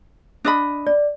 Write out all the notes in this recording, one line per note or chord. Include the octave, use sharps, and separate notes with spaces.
D4 D#5 B5
D5